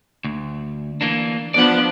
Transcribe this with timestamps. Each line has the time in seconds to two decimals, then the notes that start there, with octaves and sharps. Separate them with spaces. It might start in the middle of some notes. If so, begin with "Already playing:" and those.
0.24 D2
1.01 E3 A#3 D4
1.54 F3 B3 D4 D5 F#5